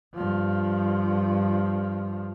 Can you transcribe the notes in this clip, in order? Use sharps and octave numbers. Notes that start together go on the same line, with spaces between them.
G2 F3